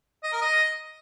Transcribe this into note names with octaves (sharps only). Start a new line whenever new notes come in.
D#5
A#4
D#5